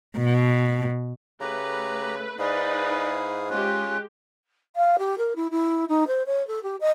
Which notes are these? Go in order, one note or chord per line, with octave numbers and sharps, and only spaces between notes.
B2
C#3 A3 G4 B4 A#5
G#2 D#4 E4 G#4 B4 D5 F5
G#3 C#4 F4 G4 F#6
F5
G4
A#4
E4
E4
D#4
C5
C#5
A4
G4
D#5